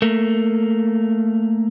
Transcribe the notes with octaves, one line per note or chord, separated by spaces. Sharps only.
A3 A#3